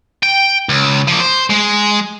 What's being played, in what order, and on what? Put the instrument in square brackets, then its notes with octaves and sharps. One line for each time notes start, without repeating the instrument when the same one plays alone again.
[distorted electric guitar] G5
C#2
F3 A#3
C5
G#3